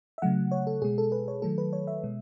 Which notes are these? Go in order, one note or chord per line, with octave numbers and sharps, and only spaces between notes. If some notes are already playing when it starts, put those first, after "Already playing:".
E5
C#3 F#3 A3 F#5
C#5
A4
B2 G#3 G#4
A4
B4
C#5
D#3 F#3 A3 A4
B4
C#5
E5
B2 G#3